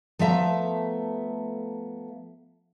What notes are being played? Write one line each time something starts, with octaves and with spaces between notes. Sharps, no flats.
F3 A3 B3 E5 A#5